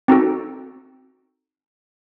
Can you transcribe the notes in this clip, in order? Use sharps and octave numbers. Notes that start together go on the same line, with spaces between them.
C4 D#4 F#4 A4